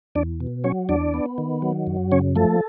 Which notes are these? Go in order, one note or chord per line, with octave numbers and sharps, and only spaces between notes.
E2 D4 D5
B2
F#3 C#4 C#5
E2 D4 D5
B3
D#3
F#3
F#2
C#3 C#4 C#5
F3 A3 A4